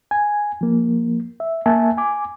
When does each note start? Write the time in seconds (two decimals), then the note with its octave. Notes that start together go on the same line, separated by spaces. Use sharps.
0.11 G#5
0.61 F3 A#3
1.40 E5
1.66 A#3 E5 G#5 A5
1.98 G#5 D6